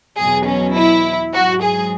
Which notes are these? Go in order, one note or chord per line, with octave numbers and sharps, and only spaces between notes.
E2 B2 F#3 G#4
C#4
E4
G#2 F#3 F#4
G#4